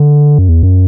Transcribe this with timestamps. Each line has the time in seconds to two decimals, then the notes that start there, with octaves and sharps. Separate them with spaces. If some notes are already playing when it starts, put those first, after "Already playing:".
Already playing: D3
0.39 F#2
0.49 E2
0.63 F#2